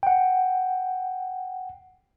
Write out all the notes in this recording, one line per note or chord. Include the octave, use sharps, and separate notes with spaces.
F#5 G5